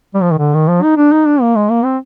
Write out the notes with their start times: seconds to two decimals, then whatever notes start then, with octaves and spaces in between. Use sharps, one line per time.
0.14 G3
0.22 F3
0.31 D#3
0.38 D3
0.54 D#3
0.68 F3
0.83 D#4
0.97 D4
1.12 D#4
1.27 D4
1.41 A#3
1.56 G#3
1.71 A#3
1.84 C4